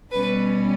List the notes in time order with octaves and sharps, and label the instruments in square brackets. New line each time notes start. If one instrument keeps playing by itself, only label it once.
[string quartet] B2 G3 C#4 B4